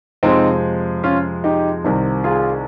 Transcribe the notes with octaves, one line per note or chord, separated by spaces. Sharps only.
F2 C3 F3 G#3 C4 D#4
C#4 F4
D#4 G4
C2 C3 D#3
F4 G#4